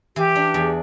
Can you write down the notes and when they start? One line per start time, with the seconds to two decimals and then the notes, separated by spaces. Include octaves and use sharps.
0.16 E3 G4
0.35 D4
0.54 E2